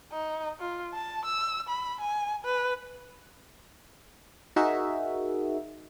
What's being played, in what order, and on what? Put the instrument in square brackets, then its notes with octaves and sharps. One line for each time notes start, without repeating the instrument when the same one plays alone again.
[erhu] D#4
F4
A5
E6
B5
G#5
B4
[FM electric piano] D#4 F#4 G#4 A#4 E5